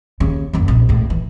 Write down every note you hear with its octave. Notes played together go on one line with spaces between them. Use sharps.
D#2 C#3
F#1 E2
A#1 F2
C#2 A2
E3